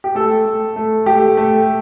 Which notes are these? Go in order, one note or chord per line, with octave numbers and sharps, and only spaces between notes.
G4
A3 A4
A3
A3
A3 G4
A3